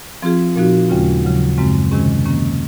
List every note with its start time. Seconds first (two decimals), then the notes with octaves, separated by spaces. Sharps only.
0.22 F3 C4 F4 G#4
0.56 A#2 F3 C4 D#4 F#4
0.89 D#2 C#3 G#3 C#4 F4
1.24 D#2 C#3 F#3
1.58 F#2 C#3 G#3 C4
1.91 C3 D#3 G#3 C#4 G#4
2.25 D#3 A#3 C#4